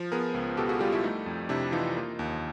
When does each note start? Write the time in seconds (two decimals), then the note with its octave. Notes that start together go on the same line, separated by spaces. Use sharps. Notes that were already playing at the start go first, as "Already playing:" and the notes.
Already playing: F3
0.12 B3 G#4 A#4
0.34 C#2
0.57 B2 G4 A4
0.69 F#4 G#4
0.81 G3 F4 G4
0.92 E4 F#4
1.03 A3 D#4
1.26 F2
1.49 C3 D4 E4
1.72 E3 D#4 F4
1.96 A#3
2.19 D#2